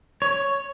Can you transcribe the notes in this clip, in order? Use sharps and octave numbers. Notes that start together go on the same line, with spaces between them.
C#5